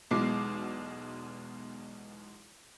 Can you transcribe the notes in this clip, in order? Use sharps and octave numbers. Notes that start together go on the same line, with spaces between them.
B1 E2 B2 G#3 D6 C7